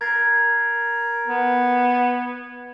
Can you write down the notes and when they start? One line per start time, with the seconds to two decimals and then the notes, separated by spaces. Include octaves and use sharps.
0.01 A#4 G#6 A6 C7
1.27 B3